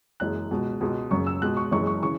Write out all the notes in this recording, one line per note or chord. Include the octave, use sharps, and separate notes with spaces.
F#1 F#2 E3 G#3 F#6
C#2 B2 G#3
C#2 B2 G#3
F#1 F#2 C#3 C#6
E6
C#2 B2 G#3 F#6
C#6
F#1 F#2 E3 G#3 C#6
C#6
C#3 E3 C#6